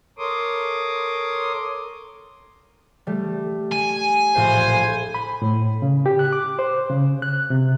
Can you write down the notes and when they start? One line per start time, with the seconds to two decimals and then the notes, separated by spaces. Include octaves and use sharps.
0.18 A4 A#4 C#5 C6 D6 D#6
3.07 G3 A3
3.72 G#5
4.36 A#1 A2 C5
5.14 B5
5.42 A2
5.82 C#3
6.06 G4
6.19 F#6
6.32 D6
6.59 C5
6.90 C#3
7.22 F#6
7.50 C3